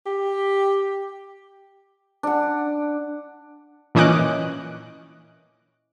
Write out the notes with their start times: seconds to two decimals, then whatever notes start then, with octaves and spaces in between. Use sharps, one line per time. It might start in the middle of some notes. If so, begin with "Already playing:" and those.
0.06 G4
2.23 D4 F#5
3.95 A#2 E3 C#4 D#5 D6 F#6